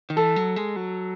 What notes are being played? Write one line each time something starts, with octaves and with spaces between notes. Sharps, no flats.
D#3
E3 A4
F#3
G#3
F#3